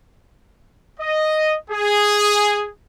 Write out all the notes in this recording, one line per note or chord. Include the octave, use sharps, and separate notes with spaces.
D#5
G#4